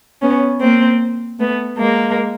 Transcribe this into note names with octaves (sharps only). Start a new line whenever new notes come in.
B3 C#4
A#3 C4
A3 B3
G#3 A#3